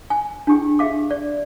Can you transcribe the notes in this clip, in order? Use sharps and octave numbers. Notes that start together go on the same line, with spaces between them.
G#5
D4 E4 G4 G#4 G5
G4 G#4 E5 F5 D6
D5